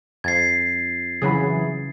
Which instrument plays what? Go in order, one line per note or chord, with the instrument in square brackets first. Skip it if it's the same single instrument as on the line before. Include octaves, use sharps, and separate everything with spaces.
[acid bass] F2 [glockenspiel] G#6 A6 C7
[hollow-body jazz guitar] C#3 B5 [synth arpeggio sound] E3 F#3 G#4